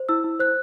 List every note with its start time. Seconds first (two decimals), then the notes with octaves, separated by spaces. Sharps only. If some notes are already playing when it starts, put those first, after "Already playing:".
Already playing: C5
0.09 E4 E6
0.24 E4
0.40 C5 F#6